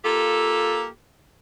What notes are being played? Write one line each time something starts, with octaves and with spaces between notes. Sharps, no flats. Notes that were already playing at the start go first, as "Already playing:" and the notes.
A#3 F4 G4 A4